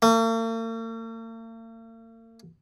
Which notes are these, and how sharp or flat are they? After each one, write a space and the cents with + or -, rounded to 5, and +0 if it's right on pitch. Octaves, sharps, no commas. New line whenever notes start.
A#3 -45